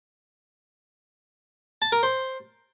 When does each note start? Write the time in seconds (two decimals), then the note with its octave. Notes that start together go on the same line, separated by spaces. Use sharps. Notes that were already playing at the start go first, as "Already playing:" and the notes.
1.82 A5
1.92 A#4
2.03 C5